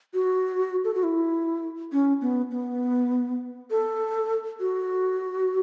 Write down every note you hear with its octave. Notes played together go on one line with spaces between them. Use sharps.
F#4
A4
F#4
E4
C#4
B3
B3
A4
F#4